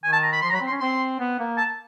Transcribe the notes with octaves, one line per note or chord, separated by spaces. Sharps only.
D#3 G#5
A5
A#5
B5
F3 C6
F#3 A#5 B5
C4
C6
C#4
C4 C6
B3
A#3
A5